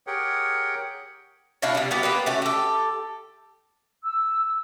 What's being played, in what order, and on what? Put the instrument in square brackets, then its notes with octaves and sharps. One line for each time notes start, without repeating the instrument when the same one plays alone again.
[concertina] G4 G#4 A#4 C#5 F#5 G5
[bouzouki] B2 D4 E4 F5
C3 G3
G3 A#3 B3 F#4
A#3 G4 B4
A3 C#4 F#4
G4 A4
[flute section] E6